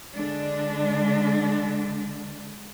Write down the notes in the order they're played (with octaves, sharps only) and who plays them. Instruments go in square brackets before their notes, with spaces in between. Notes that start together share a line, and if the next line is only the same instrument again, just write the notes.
[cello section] D3 G#3 D4